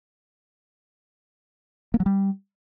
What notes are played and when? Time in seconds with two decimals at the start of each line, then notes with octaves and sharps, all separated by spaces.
1.94 A#3
2.00 F#3
2.06 G3